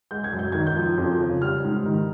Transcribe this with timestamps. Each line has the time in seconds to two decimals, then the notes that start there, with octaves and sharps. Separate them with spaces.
0.11 G#3 G6
0.24 G#6
0.33 F#2
0.39 G6
0.52 D#3 G#6
0.67 G6
0.76 F3
0.98 F2
1.20 C#3
1.42 G3 F6
1.64 G#2
1.86 D#3